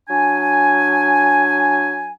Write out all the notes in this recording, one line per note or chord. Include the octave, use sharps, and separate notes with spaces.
F#3 D4 G#5